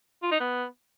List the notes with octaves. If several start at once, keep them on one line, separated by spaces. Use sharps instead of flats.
F4
D#4
B3